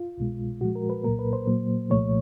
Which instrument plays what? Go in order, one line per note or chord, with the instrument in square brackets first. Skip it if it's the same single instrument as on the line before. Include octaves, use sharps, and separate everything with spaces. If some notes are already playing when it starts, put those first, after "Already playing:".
Already playing: [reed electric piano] F4
C2 B2 G#3
A#2 F3 G#3 F#4
A#4
B4
C2 A#2 F#3 A#3 A#4
B4
C5
A#2 F#3 A#3
C2 A#2 F3 A3 C#5